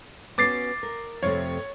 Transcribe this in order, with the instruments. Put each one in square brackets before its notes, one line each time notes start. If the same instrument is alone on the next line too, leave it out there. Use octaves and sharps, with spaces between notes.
[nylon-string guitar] B3 C#4 F#4 [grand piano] D6 A6 C7
[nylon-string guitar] A#4
[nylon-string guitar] F2 C3 A3 [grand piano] C#5